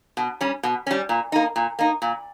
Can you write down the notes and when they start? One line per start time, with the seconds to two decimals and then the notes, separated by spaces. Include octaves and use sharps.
0.17 B2
0.41 G3 C#4
0.63 B2
0.87 G3 C#4
1.09 A#2
1.32 A#3 D#4
1.56 A#2
1.79 A#3 D#4
2.02 A#2